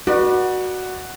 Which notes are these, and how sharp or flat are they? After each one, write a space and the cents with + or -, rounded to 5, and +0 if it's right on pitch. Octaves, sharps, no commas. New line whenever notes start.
F#4 +0 B4 -35 D5 +25